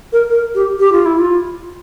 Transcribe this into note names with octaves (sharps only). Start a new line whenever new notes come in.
A#4
A#4
G4
G4
F4
E4
F4